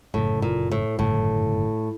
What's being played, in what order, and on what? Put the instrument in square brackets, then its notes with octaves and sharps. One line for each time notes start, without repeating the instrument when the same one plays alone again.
[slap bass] G1 F#2 C#3 [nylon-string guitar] A2
[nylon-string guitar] A#2
A2
[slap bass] G1 F#2 C#3 [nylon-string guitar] A2